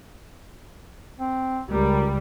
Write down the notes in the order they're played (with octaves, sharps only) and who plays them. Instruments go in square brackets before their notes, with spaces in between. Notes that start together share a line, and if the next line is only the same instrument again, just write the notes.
[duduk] C4
[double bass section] C#2 [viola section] G3 [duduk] A#4